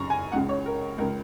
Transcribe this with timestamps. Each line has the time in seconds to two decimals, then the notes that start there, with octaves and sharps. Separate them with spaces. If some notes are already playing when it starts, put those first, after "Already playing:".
Already playing: F#2 C#3 A#5 C#6
0.10 G#5
0.32 C#2 C#3 F#5
0.49 C#5
0.66 A#4
0.98 C#2 A#4
1.01 C#3